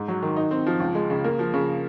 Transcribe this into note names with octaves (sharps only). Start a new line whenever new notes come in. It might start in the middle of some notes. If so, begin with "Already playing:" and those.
Already playing: G#2
F#3
D#3
D#4
C4
F3
C#2
G#3
C#3
A#3
F3
C#3